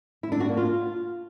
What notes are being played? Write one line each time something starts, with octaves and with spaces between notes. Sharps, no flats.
E4
D4
F#4
A#3
F4